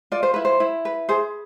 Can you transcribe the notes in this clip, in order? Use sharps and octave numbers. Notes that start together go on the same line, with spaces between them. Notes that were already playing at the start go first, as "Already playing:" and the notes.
F4 D5
C5
E4 B4
C5
E4
B4
G#4 C5